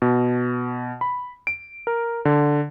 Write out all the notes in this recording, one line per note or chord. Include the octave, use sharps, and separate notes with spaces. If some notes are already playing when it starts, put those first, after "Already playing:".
B2
B5
D7
A#4
D3